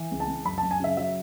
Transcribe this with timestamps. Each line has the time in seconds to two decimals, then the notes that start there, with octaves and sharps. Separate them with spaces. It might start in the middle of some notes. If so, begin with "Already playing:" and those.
Already playing: E3
0.11 C#2
0.20 A5
0.28 C#2
0.45 F#2 B5
0.58 A5
0.63 F#2
0.71 G#5
0.80 C#3 E5
0.97 F#3 E5